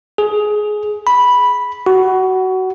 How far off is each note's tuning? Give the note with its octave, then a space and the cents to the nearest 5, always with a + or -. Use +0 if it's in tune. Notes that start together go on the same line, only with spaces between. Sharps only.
G#4 +15
B5 -5
F#4 +20